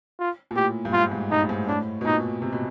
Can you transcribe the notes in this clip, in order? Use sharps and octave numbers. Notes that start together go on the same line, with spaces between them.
F4
A#2
A2 G4
G2
G#2 F4
G#2
G2 D#4
A2
G#2
A2 D4
B2
A#2 D#4
C3
B2